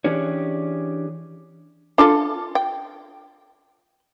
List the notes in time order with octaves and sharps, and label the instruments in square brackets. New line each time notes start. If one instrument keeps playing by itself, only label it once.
[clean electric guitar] E3 C#4 D4 G4 G#4 C#5
[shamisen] D4 F4 A4
G5